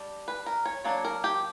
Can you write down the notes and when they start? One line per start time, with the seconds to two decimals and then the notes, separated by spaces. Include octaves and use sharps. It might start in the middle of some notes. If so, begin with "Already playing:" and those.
Already playing: G3 D4
0.28 B4
0.46 A#4
0.66 C#5
0.84 F#3 A#3 D4 C#5
1.05 A#4
1.24 G4